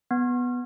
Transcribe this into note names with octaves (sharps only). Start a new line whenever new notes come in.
B3